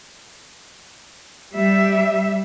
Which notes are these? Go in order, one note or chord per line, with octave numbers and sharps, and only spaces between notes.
G3 E5